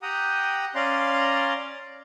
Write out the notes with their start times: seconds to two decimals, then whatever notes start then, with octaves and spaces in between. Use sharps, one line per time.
0.02 G4 F#5 G5 A#5 D#6
0.75 C#4 D5 F5 A#5 C6